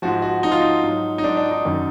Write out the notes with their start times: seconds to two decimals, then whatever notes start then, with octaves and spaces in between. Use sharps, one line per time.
0.02 G#2 F3 F#4
0.22 F#4
0.43 G#2 F3 D#4
0.52 F4
0.60 D#4
0.83 G#2 F#3
1.18 D#4
1.24 G#2 F#3 D4
1.37 D4
1.51 D#4
1.65 F#2 D#3 F#3